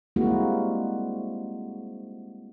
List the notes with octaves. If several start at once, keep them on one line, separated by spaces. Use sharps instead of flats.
G3 G#3 A#3 C4 E4 F#4